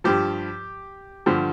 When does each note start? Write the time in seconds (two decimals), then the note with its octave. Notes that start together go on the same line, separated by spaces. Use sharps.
0.04 G2 F3 G4
1.26 G2 D3 F3